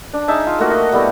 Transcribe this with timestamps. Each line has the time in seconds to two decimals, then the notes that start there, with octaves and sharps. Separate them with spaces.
0.14 D4
0.28 D#4 G#4 E5 A5
0.47 F4
0.59 A3 A#3 F#4 E5
0.71 D#5
0.92 G3 A3 B3 E4